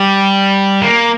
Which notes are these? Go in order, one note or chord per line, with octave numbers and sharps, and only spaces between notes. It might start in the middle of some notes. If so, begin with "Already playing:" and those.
Already playing: G3
A#3